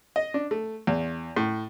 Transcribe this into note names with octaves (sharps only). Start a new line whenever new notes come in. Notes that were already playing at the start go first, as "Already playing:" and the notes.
D#5
D4
A3
E2
A2